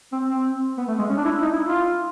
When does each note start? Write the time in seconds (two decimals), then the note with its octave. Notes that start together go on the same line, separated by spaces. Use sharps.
0.12 C4
0.28 C4
0.77 B3
0.88 A3
0.98 G#3
1.09 C#4
1.17 D4
1.25 E4
1.42 D#4
1.53 E4
1.64 F4